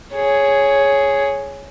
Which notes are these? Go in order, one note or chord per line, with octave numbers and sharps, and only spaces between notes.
G#4 C#5